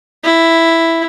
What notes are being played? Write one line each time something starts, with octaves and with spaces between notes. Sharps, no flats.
E4